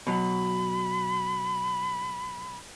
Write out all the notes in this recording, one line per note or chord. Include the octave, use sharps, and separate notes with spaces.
B2 F#3 B5